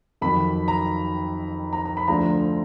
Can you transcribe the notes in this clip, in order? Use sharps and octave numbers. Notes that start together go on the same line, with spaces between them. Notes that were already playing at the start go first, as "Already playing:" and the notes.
F2 D#3 F#3 B5
A#5
A#5
A#5
B5
D2 D3 F3 A#5